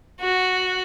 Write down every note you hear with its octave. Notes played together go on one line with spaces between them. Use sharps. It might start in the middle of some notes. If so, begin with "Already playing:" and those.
F#4